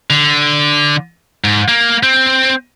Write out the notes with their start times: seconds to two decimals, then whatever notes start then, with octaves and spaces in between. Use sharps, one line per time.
0.10 D3
1.44 G#2
1.68 A#3
2.03 C4